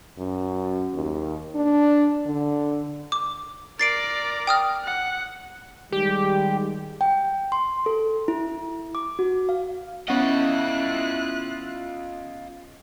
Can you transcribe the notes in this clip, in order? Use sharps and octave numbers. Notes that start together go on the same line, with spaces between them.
F#2
D#2
D4
D3
D6
A#4 D5 A6 C7 D7
G5 D#6 F6
F#5
D#3 G3 G#3 G4
G5
C6
A4
E4
D6
F#4
F5
B3 C#4 E4 F4 D#5 F#5 F#6